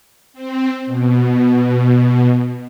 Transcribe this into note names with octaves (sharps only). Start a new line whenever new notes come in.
C4
B2